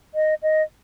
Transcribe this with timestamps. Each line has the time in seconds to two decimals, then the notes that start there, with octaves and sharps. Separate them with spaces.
0.15 D#5
0.43 D#5